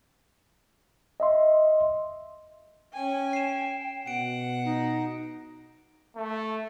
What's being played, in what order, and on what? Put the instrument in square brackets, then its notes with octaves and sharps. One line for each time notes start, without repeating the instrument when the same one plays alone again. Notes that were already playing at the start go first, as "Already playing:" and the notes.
[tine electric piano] D#5 E5 C6
[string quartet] C#4 G#5 [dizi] G5
[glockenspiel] C7 E7
[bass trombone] B2 [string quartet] F#5 [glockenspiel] D7
[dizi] D#4
[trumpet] A3